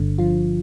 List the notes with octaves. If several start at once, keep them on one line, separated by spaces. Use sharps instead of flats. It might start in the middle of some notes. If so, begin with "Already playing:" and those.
Already playing: G1 G2 D3
F3 F4